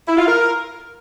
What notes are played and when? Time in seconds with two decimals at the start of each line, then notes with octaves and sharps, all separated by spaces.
0.08 E4
0.18 F4
0.27 A#4